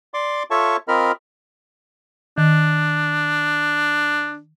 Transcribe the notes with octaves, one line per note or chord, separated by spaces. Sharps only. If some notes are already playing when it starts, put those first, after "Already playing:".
D5 C6 D6
F4 A4 C#5 E5 A5 C#6
C4 F4 A#4 D#5 B5 F6
D#3 D4